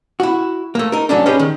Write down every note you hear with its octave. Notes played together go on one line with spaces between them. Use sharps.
E4 F#4
A3 A#3
D#4 A#4
G#2 F#3 A3 C#4 D4
C#4 D#4 G4 G#4 B4
D#3